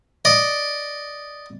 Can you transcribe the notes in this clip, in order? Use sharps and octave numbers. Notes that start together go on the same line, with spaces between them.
D5 D#5